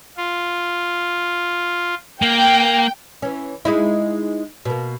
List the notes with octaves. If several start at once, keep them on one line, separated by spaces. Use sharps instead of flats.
F4
A#3 G5
E3 C#4
G#3 D#4 E4
B2 A#3